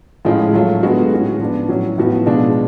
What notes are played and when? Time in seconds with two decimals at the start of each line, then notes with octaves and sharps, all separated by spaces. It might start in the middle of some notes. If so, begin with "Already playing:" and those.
0.25 A2 F3 G#3 C#4 F4
0.53 F#3 A3 F4
0.83 D3 G#3 B3 F#4
1.12 A2 G#3 C#4 F#4
1.39 F3 B3 D4
1.69 A2 F#3 C#4 F#4
1.98 A2 F3 B3 F#4
2.26 B2 G#3 D4 F4